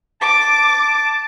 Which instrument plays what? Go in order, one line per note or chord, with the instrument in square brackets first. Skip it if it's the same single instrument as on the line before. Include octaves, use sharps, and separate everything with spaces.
[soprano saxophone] A5 [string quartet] D6